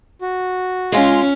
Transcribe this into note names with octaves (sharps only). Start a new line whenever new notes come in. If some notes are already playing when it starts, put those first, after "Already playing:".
F#4
G#3 C#4 F4